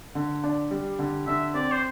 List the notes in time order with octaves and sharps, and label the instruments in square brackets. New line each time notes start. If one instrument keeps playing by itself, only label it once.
[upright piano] D3
D4
G3
D3
[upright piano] D3 [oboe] E5
[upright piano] C4 [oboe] D5
[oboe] C5